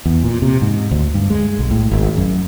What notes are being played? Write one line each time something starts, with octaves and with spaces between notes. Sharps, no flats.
E2
A#2
C3
G#2
D2
G2
G#3
B1
A2
G#1
F#2